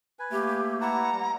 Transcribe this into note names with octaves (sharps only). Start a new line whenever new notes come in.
B4 G#5
A3 A#3 G4
E4 B4 F#5 A5 A#5
G3